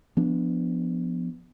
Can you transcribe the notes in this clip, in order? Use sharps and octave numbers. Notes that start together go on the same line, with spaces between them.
F3 B3 D4